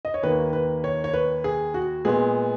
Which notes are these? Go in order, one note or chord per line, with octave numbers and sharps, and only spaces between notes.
D#5
C#5
D#2 D#3 A#3 B4
B4
C#5
C#5
B4
G#4
F#4
A#2 G#3 B3 G#4